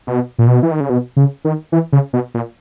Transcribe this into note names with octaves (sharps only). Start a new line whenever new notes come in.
B2
A#2
B2
E3
D#3
C#3
B2
C#3
D#3
E3
C#3
B2
A#2